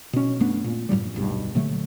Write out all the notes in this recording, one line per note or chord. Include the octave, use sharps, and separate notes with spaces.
B2 C#4
F#2 A3 B3 D4
A#2
G2 A#2 F#3 G3
D1 B1 G2
A#2 D3 F#3 A3